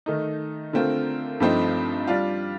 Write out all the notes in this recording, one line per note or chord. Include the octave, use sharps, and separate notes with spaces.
D#3 A3 D#4
D3 A3 C4 F4 A#4
G2 F3 A3 C4 D#4
G3 D4 F4